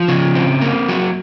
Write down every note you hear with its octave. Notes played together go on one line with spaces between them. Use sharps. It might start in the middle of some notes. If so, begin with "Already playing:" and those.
Already playing: F3
C#3
C4
A#3
F#3